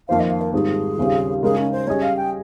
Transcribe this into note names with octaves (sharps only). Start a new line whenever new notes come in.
F2 D#3 A#3 F4 C5 F5
D#5
F5
A#4
G#2 D#3 G3 C4 F4 G#4
D#2 C#3 G3 C4 F4
C#3 G#3 D#4 G#4 A#4
C#4
C5
G3 C#4 G#4 C#5 D#5
F5
G5